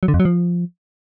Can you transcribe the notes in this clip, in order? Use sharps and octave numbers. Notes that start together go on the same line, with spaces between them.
F#3
D3
F2
F#3
F3